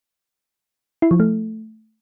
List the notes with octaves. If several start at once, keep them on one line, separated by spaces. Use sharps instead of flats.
E4
F3
A3